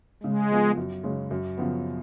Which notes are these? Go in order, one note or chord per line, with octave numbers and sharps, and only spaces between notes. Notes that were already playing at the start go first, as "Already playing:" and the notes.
C#3 G#3
F3 B3 F4
F#2
C#3 G#3 C#4
F#2
C#3 F3 B3